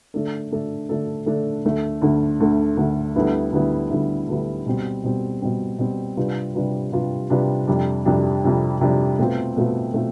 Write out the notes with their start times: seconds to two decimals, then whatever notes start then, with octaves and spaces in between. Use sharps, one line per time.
0.14 D3 A3 D4 A4
0.52 D3 A3 D4 A4
0.89 D3 A3 D4 A4
1.26 D3 A3 D4 A4
1.65 D2 D3 A3
2.02 D2 D3 A3
2.40 D2 D3 A3
2.77 D2 D3 A3
3.16 D2 D3 G3 B3 E4
3.52 D2 D3 G3 B3 E4
3.91 D2 D3 G3 B3 E4
4.28 D2 D3 G3 B3 E4
4.66 B2 G3 C4
5.04 B2 G3 C4
5.42 B2 G3 C4
5.79 B2 G3 C4
6.17 C3 G3 D4 F4 B4
6.55 C3 G3 D4 F4 B4
6.92 C3 G3 D4 F4 B4
7.30 C3 G3 D4 F4 B4
7.67 F2 C3 G3 D4
8.05 F2 C3 G3 D4
8.44 F2 C3 G3 D4
8.81 F2 C3 G3 D4
9.19 B2 A3 C4 F4 B4
9.56 B2 A3 C4 F4 B4
9.94 B2 A3 C4 F4